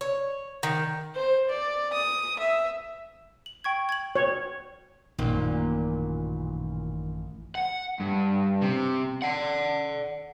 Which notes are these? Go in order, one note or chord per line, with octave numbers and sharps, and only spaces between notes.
C#5
D#3
C5
D5
D#6
E5
F#7
G5 C#6 G#6
G#6 F#7
C#5
A1 F#2 A#2 D#3
F#5
G2
C3
D5 F#5